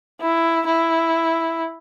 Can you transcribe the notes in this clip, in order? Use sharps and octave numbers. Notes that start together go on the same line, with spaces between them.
E4
E4